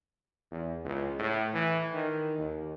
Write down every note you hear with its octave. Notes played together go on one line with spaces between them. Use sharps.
E2
C#2
A2
E3
D#3
D#2